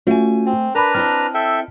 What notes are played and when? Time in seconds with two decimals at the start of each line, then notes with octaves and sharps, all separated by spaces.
0.07 A3 C#4 F4 F#4 G#5
0.46 C4
0.75 D4 A#4 B4 A#5 B5
0.95 C4 E4 D#5 A5 F6
1.34 A4 E5 G5